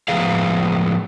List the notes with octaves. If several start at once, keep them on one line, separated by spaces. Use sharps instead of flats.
A2 F3 G#3 B3 G#4 F5